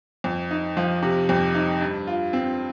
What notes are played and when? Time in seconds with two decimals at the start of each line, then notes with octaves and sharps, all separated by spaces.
0.24 F2
0.51 D#4
0.77 F3
1.02 C3
1.29 F2
1.55 D#4
1.81 G2
2.07 F4
2.33 C4